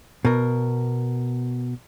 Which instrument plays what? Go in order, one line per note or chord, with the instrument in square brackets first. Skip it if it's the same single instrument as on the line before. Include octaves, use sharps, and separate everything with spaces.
[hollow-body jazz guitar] B2 A#4